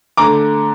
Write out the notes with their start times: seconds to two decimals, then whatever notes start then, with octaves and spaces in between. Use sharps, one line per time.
0.17 D3 A3 A#5 D6